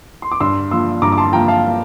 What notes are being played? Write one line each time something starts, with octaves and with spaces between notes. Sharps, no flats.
C6
D6
G2 C6 E6
F3 A#3 C6 E6
G2 A#5 D6
D6
A5 C6
F3 A#3 G5 A#5
F5 A5